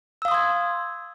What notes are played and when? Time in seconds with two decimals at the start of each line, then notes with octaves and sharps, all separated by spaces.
0.22 E6
0.25 F5
0.28 D#6
0.31 C6
0.34 G#6